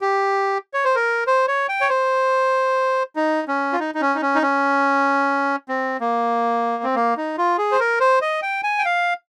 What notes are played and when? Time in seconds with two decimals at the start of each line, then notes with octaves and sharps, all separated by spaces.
0.01 G4
0.74 C#5
0.85 C5
0.95 A#4
1.27 C5
1.48 C#5
1.69 G5
1.81 C#5
1.89 C5
3.16 D#4
3.48 C#4
3.73 F4
3.80 D#4
3.95 D#4
4.01 C#4
4.15 D#4
4.21 C#4
4.35 D#4
4.42 C#4
5.69 C4
6.00 A#3
6.83 C4
6.95 A#3
7.17 D#4
7.38 F4
7.58 G#4
7.72 C5
7.80 A#4
8.00 C5
8.21 D#5
8.42 G5
8.63 G#5
8.79 G5
8.85 F5